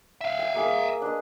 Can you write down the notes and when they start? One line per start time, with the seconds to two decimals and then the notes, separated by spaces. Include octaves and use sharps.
0.21 E5 F5
0.39 G5
0.54 A#3 G#4 A#4
1.02 D4 B4 D#5